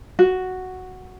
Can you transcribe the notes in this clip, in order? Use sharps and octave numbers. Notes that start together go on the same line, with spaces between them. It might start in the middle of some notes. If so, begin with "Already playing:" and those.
F#4